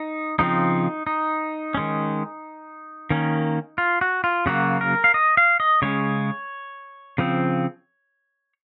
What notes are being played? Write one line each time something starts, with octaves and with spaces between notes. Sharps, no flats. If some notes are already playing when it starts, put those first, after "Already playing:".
Already playing: D#4
C#3 F3 C4 D#4
D#4
D#3 G#3 C#4
D#3 A#3 C#4
F4
F#4
F4
C#3 F#3 A#3 F#4
A#4
F5
D#5
F5
D#5
C#3 G#3 C#4 C#5
C#3 F3 C4